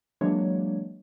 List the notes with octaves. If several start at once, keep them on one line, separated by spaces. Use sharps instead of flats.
E3 F#3 G#3 A#3 D4 C#5